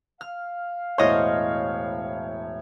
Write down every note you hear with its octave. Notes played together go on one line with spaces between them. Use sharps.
F5 F6
E1 A2 C5 C#5 D#5 F6